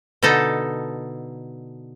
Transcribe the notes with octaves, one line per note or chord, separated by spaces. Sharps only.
B2 D3 D#4 A4 A5